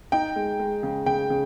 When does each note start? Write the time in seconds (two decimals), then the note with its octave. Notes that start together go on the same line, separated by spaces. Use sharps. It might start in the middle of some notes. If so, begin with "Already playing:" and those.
0.12 D#4 G5
0.36 G#3
0.59 G#3
0.83 C#3
1.06 C#3 G5
1.30 C#3